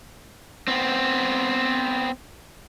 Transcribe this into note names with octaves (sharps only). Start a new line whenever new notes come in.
B3 C4